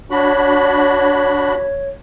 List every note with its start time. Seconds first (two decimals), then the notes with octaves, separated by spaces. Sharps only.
0.11 D4 F#4 C#5 B5